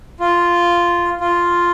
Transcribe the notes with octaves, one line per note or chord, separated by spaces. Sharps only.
F4
F4